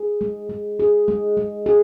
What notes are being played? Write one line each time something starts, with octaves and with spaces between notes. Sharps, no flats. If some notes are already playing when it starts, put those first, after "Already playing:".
Already playing: G#4
G#3
G#3
G#4
G#3
G#3
G#4